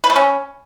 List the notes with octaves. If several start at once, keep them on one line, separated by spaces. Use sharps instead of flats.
B4
A3
C#4